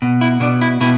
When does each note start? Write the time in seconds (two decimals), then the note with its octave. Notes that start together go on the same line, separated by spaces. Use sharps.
0.02 B2
0.21 E4
0.40 B2 D4
0.61 E4
0.81 B2 E4